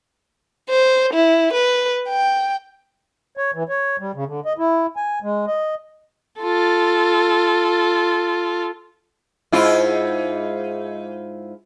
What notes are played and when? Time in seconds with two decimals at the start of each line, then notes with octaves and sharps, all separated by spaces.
0.70 C5
1.13 E4
1.53 B4
2.09 G5
3.37 C#5
3.54 E3
3.69 C#5
4.00 G3
4.15 C#3
4.27 D3
4.45 D#5
4.58 E4
4.97 G#5
5.23 G#3
5.47 D#5
6.41 F4 A4
9.52 G#2 E4 F4